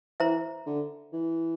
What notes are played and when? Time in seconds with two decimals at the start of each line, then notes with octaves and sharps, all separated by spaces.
0.20 E3 C5 E5 A#5
0.66 D3
1.13 E3